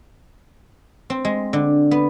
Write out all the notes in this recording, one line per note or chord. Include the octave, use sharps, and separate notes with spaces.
C4
G#3
D3
B3